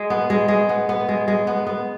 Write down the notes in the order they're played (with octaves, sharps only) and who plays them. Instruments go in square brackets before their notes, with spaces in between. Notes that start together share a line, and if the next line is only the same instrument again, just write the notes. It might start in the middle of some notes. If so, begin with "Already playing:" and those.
Already playing: [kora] G#3
B3
G#3
G#3
B3
B3
G#3
G#3
B3
B3